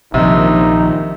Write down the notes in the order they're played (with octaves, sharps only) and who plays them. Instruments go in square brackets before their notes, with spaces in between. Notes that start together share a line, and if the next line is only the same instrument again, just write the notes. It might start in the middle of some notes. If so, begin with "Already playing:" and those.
[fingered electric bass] A#1 [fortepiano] C3 [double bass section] D#3 F3 [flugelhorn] D#4